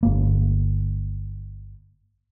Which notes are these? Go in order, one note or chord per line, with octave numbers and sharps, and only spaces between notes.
G1 A#3